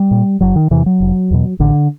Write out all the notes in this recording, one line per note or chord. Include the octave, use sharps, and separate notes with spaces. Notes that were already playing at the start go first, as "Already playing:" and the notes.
Already playing: G3
A#2
F#1 F#3
D#3
E2 C3 E3
F#3
F1
E2 B2
A1 D3